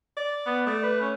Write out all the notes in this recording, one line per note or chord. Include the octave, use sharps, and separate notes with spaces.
D5
B3
A3 D5
B4
C#4